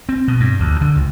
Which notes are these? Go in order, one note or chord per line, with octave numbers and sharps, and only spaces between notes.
C4
B2
G2
D2
D3
C#2